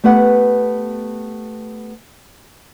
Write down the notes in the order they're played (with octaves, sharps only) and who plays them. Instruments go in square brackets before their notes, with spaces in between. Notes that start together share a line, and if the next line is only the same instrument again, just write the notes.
[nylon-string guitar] A3 B3 G4 B4 F#5